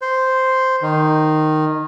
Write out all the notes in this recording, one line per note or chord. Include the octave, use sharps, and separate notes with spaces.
C5
D#3